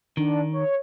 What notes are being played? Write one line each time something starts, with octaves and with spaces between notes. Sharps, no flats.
D#3 D4
C#5